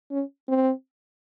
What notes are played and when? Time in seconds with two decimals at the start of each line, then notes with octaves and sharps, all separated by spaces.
0.11 C#4
0.48 C4